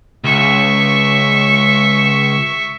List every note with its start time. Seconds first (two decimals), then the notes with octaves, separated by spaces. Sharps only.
0.24 C#2 E5 C#6